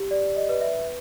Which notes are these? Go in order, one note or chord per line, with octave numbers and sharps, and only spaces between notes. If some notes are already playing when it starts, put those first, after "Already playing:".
Already playing: G4
D5
D#5
B4
E5